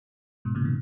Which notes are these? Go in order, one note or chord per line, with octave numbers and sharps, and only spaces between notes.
G#2 B2
A#2 C#3
B2 D#3